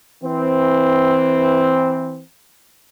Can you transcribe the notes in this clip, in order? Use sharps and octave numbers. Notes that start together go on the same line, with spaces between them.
E3 C4